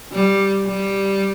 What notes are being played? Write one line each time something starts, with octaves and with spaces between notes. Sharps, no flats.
G3
G3